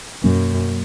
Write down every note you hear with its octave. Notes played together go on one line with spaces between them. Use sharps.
F#2 B2 F#3 A#3 C#4